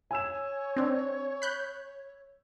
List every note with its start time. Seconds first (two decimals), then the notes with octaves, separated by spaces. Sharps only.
0.11 C#5 G#5 E6 E7
0.76 C4 D4
1.42 B5 F#6 G6